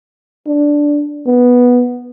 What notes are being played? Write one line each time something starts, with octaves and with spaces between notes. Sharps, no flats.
D4
B3